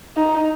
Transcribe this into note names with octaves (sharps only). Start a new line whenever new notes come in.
D#4